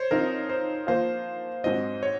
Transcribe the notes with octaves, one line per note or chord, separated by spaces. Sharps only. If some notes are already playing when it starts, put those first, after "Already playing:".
Already playing: C5 C#5
F3 C4 D#4 A#4
C5
F3 A#3 F4 C5
G#2 F#3 C4 D#5
C#5